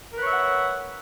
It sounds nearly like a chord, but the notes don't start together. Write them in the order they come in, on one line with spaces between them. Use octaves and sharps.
A#4 B4 C#5 E5 F#5